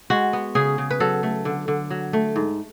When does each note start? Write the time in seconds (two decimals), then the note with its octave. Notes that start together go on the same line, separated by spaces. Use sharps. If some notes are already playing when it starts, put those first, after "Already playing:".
0.10 G#3 F#4
0.33 B3
0.55 C#3 G#4
0.78 C#3
0.91 B4
1.00 F#3 A4
1.23 A3
1.45 D3
1.68 D3
1.90 F#3
2.13 A3
2.36 G#2